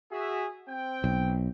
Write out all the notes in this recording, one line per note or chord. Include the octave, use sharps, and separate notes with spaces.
F#4 G#4 E5
C4 G5
B1